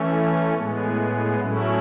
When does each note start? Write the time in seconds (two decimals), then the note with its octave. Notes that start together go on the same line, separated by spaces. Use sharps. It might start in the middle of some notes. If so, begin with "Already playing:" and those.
Already playing: E3 A3 C#4
0.54 A2 G#3 B3
1.40 A2 F#3 A3 C#4 E4